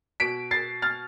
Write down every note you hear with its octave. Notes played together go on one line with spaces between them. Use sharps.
B2 B6 D7
A6 C7
F6 A6